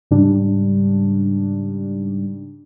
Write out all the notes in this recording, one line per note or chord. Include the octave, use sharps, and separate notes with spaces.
G#2 C#3 G3 D4